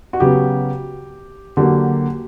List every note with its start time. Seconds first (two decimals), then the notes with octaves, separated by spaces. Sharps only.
0.13 F#4
0.20 C#3 F#3 B3 G4
1.57 D3 F#3 A#3 G4